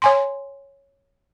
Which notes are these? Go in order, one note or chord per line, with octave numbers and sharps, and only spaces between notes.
C#5 G#5 C6